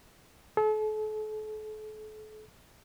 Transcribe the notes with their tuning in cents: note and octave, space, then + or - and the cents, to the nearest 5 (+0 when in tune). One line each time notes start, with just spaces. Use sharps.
A4 -40